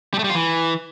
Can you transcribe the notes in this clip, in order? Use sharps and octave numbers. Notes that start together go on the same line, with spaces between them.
G3
A3
G3
F4
E3